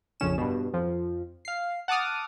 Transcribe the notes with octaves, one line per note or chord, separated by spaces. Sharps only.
A#1 F2 C#3 C#4 E7
G2 B2
F2 F3
F5 C7
F#5 A5 D6 D#6 F6